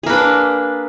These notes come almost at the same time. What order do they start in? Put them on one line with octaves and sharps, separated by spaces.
G#4 A#3 B4 D4